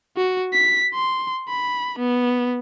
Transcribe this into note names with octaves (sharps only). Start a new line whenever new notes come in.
F#4
B6
C6
B5
B3